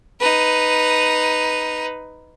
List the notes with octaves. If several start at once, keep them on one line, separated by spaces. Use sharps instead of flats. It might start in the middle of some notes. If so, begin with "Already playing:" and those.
D#4 B4